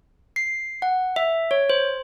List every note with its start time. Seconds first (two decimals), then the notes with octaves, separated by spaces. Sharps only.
0.36 C7
0.82 F#5
1.16 E5
1.51 C#5
1.70 C5